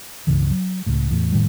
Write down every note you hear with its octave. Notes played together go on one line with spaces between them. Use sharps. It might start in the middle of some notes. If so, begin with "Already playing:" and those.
C#2 G2 C#3 E3
F#3
C#2 A2
E2 A2
F1 A2 D#3 G3